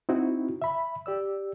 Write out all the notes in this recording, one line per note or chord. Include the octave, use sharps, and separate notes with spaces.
C4 D#4 E4 F#4
E5 B5
G4 D5 E6